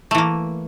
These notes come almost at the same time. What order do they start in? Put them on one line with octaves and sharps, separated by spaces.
A3 E3 A#3